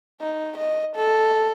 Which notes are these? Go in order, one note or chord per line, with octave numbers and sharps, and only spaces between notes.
D#4
D#5
A4